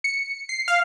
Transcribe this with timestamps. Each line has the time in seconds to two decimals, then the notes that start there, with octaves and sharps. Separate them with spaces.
0.04 C#7
0.49 C7
0.68 F5